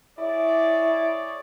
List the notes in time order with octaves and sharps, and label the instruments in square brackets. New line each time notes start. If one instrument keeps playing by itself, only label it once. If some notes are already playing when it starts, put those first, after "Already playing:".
[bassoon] E4 [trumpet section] G#4 C#5 D5